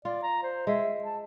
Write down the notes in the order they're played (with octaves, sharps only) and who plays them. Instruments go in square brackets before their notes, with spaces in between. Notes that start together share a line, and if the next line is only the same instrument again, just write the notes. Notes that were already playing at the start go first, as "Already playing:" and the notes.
[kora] F4 [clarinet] D5
[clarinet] A#5
C5
[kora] G#3 [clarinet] E5
[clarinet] A5